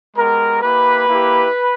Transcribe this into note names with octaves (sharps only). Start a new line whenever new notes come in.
G#3 B3 G4 A#4
A#3 E4 G4 B4
A#3 E4 G4